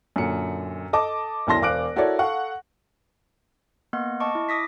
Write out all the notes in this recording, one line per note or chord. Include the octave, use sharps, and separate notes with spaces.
F#2 A#2 D3 C#7
A4 D#5 A5 D6
E1 B1 E4 A5 C6 A#6
E1 C5 F5 D6 F#6 D7
E4 F#4 A4 A#4 C#5 D5
A4 F5 F#5 C#6
A#3 B3 D#5 F#5
D#5 A5 C#6 D6
E4
D6 D#6 A#6 B6